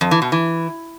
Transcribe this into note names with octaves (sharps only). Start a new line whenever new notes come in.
F2
E3
B2
E3